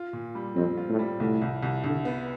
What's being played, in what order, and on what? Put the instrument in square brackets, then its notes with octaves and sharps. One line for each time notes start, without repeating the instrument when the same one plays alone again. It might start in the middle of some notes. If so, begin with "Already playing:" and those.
Already playing: [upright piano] F4
A#2
G3
[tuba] F2 [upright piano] C4
[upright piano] F4
[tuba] A2
[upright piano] G3
[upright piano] C2 [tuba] A2
[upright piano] C2
C2
[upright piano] C2 [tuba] D3
[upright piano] B3